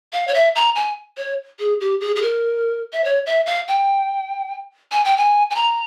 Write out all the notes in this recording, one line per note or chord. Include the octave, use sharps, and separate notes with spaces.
F5
C#5
E5
A#5
G#5
C#5
G#4
G4
G#4
G#4
A#4
E5
C#5
E5
F5
G5
G#5
G5
G#5
G#5
A#5